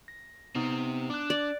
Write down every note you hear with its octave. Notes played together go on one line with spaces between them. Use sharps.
A#6
C3 B3 C4 D#4 D#6
D4 D6 F#6
D5